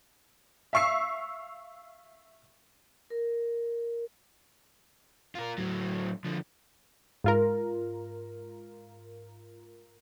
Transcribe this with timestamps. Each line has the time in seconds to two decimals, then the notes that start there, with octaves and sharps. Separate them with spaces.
0.73 E5 F5 C#6 E6 C7
3.10 A#4
5.35 F4 A#4
5.58 A2 F#3
6.25 D3 F3
7.24 G#2 F4 A#4